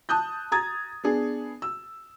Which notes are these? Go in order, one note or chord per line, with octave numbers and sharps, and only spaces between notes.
A5 D#6 F#6 G6
A#5 D#6 G#6 A6
B3 D4 G#4
E6